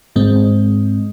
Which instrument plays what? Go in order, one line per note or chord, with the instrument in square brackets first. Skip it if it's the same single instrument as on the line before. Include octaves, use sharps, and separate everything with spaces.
[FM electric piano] G#2 G#3 C4